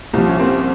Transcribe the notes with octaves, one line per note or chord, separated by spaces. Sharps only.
C2 A#2 F3
C#4
A#3 C4